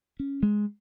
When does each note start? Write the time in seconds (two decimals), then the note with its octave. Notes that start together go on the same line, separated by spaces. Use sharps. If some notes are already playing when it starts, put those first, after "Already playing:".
0.20 C#4
0.43 G#3